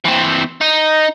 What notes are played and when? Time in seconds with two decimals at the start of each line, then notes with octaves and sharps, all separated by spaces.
0.05 E3 C4
0.61 D#4